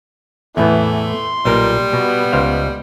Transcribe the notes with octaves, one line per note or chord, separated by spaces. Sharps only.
E2 A2 E3 A3 B3
C6
B1 A#2 G3 A#4
B2 B3
C#2 C5 F5